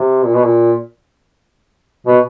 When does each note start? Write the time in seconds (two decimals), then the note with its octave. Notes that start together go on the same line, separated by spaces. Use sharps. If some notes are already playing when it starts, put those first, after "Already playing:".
Already playing: C3
0.25 A#2
0.35 B2
0.44 A#2
2.07 B2